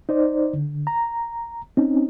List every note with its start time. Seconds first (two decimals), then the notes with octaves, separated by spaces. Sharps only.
0.09 D#4 C5 D5
0.53 D3
0.87 A#5
1.77 C4 C#4 D#4